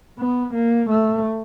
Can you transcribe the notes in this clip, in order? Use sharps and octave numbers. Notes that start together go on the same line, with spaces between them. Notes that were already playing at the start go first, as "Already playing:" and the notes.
B3
A#3
A3